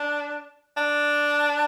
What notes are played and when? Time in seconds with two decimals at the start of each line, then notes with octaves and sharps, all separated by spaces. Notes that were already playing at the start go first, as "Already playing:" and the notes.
Already playing: D4
0.77 D4